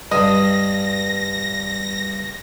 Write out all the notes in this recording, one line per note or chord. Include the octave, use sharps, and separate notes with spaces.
G2 D#5 A#6